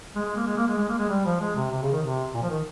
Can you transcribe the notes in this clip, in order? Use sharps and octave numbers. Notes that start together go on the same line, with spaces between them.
G#3
G#3
A#3
G#3
A#3
G#3
G#3
A#3
G#3
G3
F3
G#3
C3
C3
C#3
D#3
C3
A#2
F3
D#3